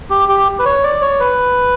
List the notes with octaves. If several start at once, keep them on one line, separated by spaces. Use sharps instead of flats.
G4
G4
B4
C#5
D5
C#5
B4